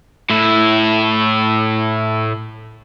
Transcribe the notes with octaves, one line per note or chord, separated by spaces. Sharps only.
A2 E4